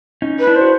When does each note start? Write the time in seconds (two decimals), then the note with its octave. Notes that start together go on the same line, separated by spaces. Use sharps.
0.22 C#4 D#4
0.39 B4
0.47 D4 E4
0.56 C5
0.61 F#4